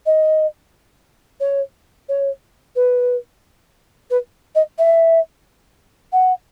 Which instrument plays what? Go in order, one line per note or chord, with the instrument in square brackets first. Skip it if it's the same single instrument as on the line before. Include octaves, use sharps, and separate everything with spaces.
[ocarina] D#5
C#5
C#5
B4
B4
D#5
E5
F#5